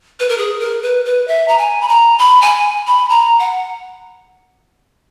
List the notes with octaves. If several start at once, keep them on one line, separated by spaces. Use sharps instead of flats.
B4
A#4
G#4
A#4
B4
B4
E5
A#5
G#5
B5
A#5
B5
G#5
B5
A#5
F#5